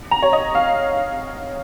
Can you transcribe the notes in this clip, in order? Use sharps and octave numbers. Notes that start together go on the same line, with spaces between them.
A#5
C#5
D#5
F5